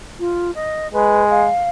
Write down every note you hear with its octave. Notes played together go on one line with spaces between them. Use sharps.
F4
D#5
G#3 B4
F5